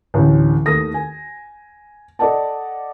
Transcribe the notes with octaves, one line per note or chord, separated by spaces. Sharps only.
A1 D2
D#2 A3 D#6 A#6
G#5
A4 D5 D#5 F#5 A5